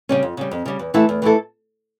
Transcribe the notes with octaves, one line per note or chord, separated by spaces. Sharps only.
C#3 G3 C#4
F2
C#3 G3
F2
C#3 G3
E2
E3 A3 E4 A4
E2
E3 A3 E4 A4